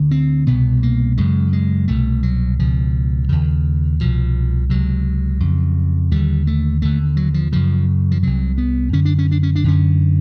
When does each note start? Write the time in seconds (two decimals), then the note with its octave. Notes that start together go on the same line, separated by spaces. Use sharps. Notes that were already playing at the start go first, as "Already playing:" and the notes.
Already playing: D2 D3
0.11 C4
0.47 C2 B2 B3
0.83 A#3
1.18 F#2 C#3 G#3
1.53 G#3
1.88 C2 B2 A3
2.23 F#3
2.59 C#2 B2 F3
3.29 D#2 C#3
4.00 C2 B2 F3
4.70 C#2 C3 F#3
5.40 F2 C#3
6.11 D#2 D3 G3
6.47 A3
6.82 D#2 D3 A3
7.17 F#3
7.34 F3
7.52 F#2 C#3 F3
8.11 F3
8.23 C2 C3 F#3
8.58 B3
8.93 F#2 D3 C#4
9.05 D4
9.19 C#4
9.31 D4
9.43 C#4
9.56 D4
9.64 F#2 D3 C#4